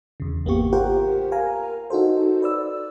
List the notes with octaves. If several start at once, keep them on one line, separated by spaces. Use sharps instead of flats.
E2 C#3
G#1 A#3 B3 G4 C#6
F4 G4 A#4 C5 F#5 G5
A#4 F5 G#5 A#5
D#4 F#4 A4 C5
B4 D5 E6